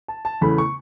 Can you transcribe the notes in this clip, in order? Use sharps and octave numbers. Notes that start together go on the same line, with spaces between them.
A5
A5
E2 C#3 E3 A3 B5
C#6